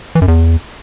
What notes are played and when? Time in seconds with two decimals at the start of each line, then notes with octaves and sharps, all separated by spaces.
0.15 E3
0.22 F#2
0.28 E2